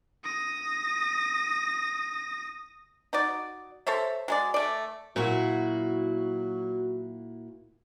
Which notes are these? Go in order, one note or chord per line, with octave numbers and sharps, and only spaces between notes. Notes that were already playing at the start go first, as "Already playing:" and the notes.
D#6 A#6
D#4 F#4 D5
A4 C5 C#5 E5
F#3 G#3 D5
A3 D5
A#2 F#3 E4 F#4